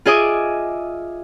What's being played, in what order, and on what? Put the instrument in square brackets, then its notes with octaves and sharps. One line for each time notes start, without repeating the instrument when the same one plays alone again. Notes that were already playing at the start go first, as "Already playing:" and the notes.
[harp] F4 G#4 D#5 E5 D6